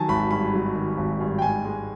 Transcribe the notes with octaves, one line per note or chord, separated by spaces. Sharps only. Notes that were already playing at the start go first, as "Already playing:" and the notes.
Already playing: D#3 F#3 G#5 A5
G#1 B5
G2 B5
F#3
D#3
G#1
G2
G5
G#2 G#5
G#3